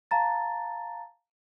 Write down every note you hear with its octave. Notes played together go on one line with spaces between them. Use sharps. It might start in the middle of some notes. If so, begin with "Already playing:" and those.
F5 A5 A#5 A6